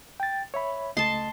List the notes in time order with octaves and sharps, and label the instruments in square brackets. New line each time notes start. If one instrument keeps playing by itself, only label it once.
[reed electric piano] G5 A6
C#5 E5 B5
[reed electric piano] C#2 A3 D#5 [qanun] A5 C6